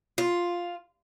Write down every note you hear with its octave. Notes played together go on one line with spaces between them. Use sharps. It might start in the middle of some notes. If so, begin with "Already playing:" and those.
F4